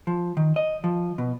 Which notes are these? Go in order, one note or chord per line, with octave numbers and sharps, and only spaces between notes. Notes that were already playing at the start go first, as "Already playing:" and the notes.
F3
D#3
D#5
F3
B2